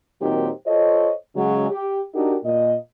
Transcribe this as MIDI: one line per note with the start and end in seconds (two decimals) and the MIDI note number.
0.21 0.48 46
0.21 0.48 51
0.21 0.48 54
0.21 0.48 60
0.21 0.48 63
0.21 0.48 67
0.66 1.10 65
0.66 1.10 69
0.66 1.10 72
0.66 1.10 73
0.66 1.10 75
1.35 1.66 49
1.35 1.66 54
1.35 1.66 56
1.70 2.00 67
2.14 2.35 62
2.14 2.35 63
2.14 2.35 66
2.14 2.35 67
2.14 2.35 70
2.44 2.75 46
2.44 2.75 75